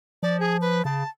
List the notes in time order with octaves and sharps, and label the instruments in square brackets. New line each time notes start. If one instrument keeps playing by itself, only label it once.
[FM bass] F3 [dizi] D5
[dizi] G#4
B4
[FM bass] C#3 [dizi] A5